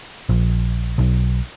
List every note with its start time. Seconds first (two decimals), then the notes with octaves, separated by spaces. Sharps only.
0.29 A#1
0.98 B1